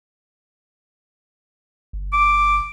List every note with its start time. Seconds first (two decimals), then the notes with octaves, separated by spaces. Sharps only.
1.93 G1
2.13 D6